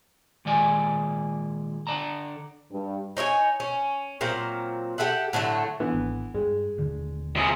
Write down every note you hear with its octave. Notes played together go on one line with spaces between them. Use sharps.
A#2 D#3 G#3 D5 G#5
D3 D5 A5 A#5
G2
D#4 C#5 D#5 G#5
C#4
A#2 F#3 C4 F5
G4 A4 E5 F#5
A2 D3 F#3 A3
D3 E3 B3
G#1
G2 G#3
D#1 D3
C3 G#4